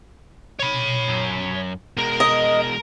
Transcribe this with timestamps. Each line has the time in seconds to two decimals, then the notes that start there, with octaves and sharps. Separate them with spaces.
0.59 C#5 B5
1.09 F#2
1.97 B2 G#3 A#4
2.20 D#5